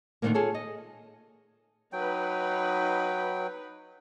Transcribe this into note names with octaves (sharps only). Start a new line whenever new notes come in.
A#2 D3 D#3 F3 A3 A#3
F4 G#4 A4 C#5
D#5
F#3 D#4 B4 G5